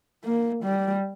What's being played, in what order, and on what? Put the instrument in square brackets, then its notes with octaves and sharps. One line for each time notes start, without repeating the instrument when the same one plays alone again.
[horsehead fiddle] A#3
G3